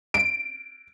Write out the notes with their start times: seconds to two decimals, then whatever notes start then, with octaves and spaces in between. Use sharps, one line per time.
0.14 D7